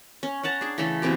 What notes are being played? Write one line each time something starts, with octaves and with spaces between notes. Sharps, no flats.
C#4
C#4 F#5 A5 A#5
D4 G#4
C#3 E3 A3 A4
B2 E3 C4 G4